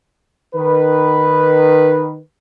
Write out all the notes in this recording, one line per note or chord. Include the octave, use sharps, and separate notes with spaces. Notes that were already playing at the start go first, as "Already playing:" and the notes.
D#3 B4